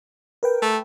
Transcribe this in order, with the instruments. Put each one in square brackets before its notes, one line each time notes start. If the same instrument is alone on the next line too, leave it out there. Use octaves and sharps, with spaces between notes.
[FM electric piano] A#4 B4 G5
[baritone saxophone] A3